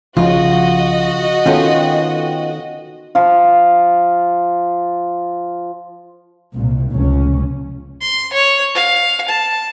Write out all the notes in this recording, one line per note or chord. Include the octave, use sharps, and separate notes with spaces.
B1 C#3 F3 F4 F#4 D#5
D#3 B3 C#4 F4 A4 G5
F3 F4
C2 A#2
F1 C#2 C#4
C6
C#5
F5
A5